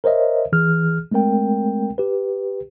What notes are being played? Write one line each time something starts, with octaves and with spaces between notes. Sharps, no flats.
A#4 C5 C#5 D#5 E5
E3 G#4 F6
G#3 A3 C4 A#4 G5
G4 B4